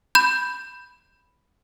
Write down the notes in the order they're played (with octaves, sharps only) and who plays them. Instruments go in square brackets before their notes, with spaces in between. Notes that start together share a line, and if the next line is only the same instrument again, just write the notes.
[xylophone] B5 G6